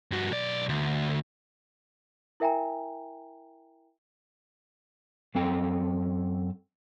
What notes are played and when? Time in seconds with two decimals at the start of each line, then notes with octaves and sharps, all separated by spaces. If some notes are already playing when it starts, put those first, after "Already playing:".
0.11 G2 F#4
0.31 B1 D5
0.69 D2
2.40 E4 A#4 E5 G5 G#5 A#5
5.35 F#2 C4 A4 G5